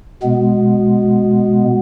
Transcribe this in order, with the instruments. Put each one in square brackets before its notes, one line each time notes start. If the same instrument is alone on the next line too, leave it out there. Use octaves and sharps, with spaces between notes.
[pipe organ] B2 G#3 B3